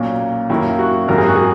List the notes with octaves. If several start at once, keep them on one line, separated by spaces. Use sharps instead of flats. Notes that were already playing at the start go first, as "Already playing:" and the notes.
Already playing: B1 A#2 A#3 C#4
F#2 D#3 A#3 C#4 E4
F#4
G#1 F#2 D#3 F#3 A#4
G#4
F#4
G#4